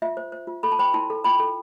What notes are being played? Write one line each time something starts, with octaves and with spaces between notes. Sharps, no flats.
F4 E5
C5
C5
F4
A4 B5
A5
C5 G5 B5
E4 A5 C6
A4
F4 G5 B5
A4